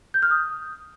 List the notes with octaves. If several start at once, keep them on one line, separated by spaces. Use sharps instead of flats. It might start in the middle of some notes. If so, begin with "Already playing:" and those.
G6
F6
D#6